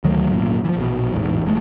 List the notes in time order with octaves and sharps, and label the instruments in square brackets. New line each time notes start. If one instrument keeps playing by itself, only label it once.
[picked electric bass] D2 D#3 F#3 A3
G#1 F#2 A#2
E3 F3
A#1 B2
A1 E2 G#2
F#1 G#3 A3